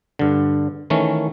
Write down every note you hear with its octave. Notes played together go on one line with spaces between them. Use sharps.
G2 D3
D#3 E3 A3 C#4